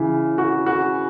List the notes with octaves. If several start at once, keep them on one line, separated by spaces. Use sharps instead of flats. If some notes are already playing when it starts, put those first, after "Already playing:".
Already playing: C#3 E3
F#4
F#4